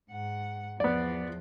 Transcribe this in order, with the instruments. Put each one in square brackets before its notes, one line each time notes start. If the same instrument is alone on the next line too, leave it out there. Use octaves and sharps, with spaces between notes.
[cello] G#2 F#5
[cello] E2 F3 [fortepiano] B3 D5